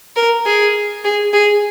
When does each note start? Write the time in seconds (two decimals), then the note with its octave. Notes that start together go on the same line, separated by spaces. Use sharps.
0.16 A#4
0.46 G#4
1.04 G#4
1.33 G#4